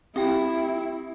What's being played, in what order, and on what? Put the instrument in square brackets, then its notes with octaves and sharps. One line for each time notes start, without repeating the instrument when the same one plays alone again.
[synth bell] C4 G4 G5 [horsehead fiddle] E4